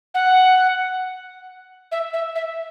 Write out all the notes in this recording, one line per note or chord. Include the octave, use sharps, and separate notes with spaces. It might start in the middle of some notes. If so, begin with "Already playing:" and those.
F#5
E5
E5
E5